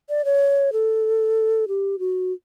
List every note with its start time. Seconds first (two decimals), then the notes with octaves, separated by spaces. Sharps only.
0.09 D5
0.25 C#5
0.73 A4
1.68 G4
1.99 F#4